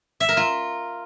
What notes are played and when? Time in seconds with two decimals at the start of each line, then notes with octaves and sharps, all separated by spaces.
0.20 E5
0.29 A#4
0.37 F4